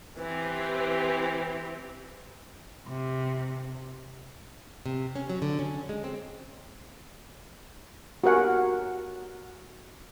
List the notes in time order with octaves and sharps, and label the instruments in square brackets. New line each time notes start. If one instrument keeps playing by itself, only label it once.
[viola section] E3 C4 G4 [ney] B4
[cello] C3
[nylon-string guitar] C3
C#4
F#3
D3
C#4
G#3
C4
[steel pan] F#4 G4 A#4 F#5 G#5